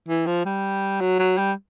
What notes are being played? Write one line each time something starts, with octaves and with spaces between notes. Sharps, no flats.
E3
F3
G3
F#3
F#3
G3